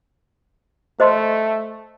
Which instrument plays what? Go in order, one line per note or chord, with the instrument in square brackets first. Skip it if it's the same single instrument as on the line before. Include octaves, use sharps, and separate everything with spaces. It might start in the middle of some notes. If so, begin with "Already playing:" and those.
[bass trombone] A3 [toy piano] C5 D#5 C6